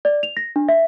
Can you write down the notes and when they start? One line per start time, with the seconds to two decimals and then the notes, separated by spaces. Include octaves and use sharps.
0.05 D5
0.23 F7
0.37 A#6
0.56 D4
0.69 E5